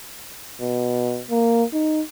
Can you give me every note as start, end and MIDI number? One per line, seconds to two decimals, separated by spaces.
0.61 1.22 47
1.30 1.64 58
1.73 2.01 63